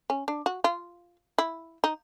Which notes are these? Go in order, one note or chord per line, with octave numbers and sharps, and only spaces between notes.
C#4
D4
F#4
F4
E4
D#4